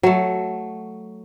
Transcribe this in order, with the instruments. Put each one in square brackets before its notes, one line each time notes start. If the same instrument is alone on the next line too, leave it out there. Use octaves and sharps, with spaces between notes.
[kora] F#3 A3